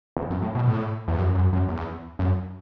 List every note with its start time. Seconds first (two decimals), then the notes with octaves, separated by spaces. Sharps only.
0.17 E2
0.30 F#2
0.42 A2
0.55 B2
0.68 A2
1.08 E2
1.18 F#2
1.35 F#2
1.53 F#2
1.69 E2
2.19 F#2